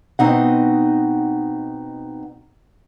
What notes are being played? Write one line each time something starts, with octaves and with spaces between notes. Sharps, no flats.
B2 C4 D#4 F#5